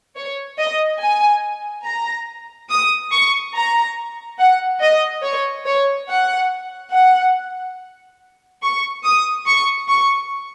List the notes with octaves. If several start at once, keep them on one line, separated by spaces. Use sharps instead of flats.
C#5
D#5
G#5
A#5
D#6
C#6
A#5
F#5
D#5
C#5
C#5
F#5
F#5
C#6
D#6
C#6
C#6